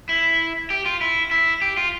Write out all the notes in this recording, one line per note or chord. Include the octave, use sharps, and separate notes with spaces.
E4
G4
F4
E4
E4
G4
F4